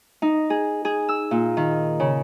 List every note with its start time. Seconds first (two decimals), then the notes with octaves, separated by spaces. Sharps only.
0.22 D#4
0.50 G#4
0.85 G#4
1.09 E6
1.31 A#2
1.57 D#3
2.00 C#3